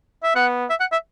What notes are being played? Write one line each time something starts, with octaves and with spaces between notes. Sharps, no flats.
E5
B3 F#5
E5
F#5
E5